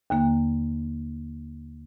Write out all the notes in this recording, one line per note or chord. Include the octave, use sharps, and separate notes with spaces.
D#2 D3 A#3